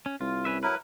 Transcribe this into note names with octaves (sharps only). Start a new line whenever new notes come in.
C#4
C2 F4
C#4 B4 E5
F#3 E4 A#4 B4